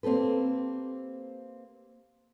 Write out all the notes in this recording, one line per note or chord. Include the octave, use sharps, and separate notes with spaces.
A#3 C4 G4 A4 B4